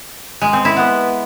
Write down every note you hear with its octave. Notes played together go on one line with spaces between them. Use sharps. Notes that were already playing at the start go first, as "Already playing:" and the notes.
G#3
C4
E4
B3